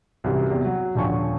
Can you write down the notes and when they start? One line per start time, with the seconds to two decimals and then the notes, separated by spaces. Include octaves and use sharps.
0.24 C2 F#2 E3 G4
0.50 E2 C3
0.65 F#3
0.95 D#1 D3 F3 G5 G#5 C#6